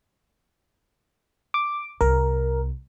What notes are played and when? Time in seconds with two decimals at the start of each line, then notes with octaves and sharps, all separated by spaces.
1.54 D6
2.01 C2 A#4